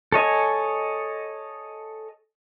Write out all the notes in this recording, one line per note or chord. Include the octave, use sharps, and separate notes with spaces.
A4 C#5 D#5 G#5